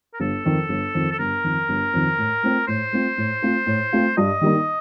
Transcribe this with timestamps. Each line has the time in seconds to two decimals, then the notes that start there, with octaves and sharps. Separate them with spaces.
0.13 A#4
0.20 G1 A4
0.44 F2 D#3
0.69 G1
0.94 F2 D#3
1.12 A4
1.19 G1 A#4
1.44 F2 D#3
1.69 G1
1.93 F2 D#3
2.18 A2
2.43 A3 C4 F4
2.67 A2 C5
2.92 A3 C4 F4
3.18 A2
3.42 A3 C4 F4
3.67 A2
3.93 A3 C4 F4
4.17 G2 D#5
4.41 D#3 G3 A#3 D#4